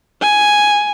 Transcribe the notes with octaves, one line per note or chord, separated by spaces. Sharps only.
G#5